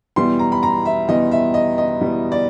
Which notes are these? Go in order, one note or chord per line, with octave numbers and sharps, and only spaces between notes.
E2 B2 G3 B3 E4 C6
A#5
B5
A#5
E5
E2 B2 G3 B3 E4 D#5
E5
D#5
D#5
E2 B2 G3 B3 E4
D5